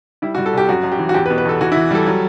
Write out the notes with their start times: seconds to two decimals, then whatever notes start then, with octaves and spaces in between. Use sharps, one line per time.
0.22 G3 E4
0.35 F#4
0.38 G3
0.46 A4
0.53 C2 G4
0.69 F#2 F#4
0.84 F#2
0.92 G4
0.99 E3
1.09 F#4
1.14 E2 G4
1.26 B4
1.30 B2
1.38 B4
1.45 E2 A4
1.61 E3 F#4
1.72 E4
1.76 E3
1.91 G3 A4
2.07 F#3